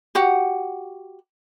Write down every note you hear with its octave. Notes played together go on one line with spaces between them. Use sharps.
F#4 G4 F#5